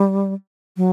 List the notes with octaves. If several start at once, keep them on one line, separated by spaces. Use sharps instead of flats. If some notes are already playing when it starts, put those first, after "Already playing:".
Already playing: G3
F#3